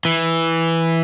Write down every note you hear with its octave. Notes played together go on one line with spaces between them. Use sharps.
E3